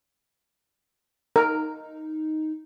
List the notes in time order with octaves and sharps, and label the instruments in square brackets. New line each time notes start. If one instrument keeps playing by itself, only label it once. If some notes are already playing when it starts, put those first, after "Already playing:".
[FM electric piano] D#4 [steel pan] A#4